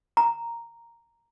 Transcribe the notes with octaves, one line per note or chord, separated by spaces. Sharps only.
A#5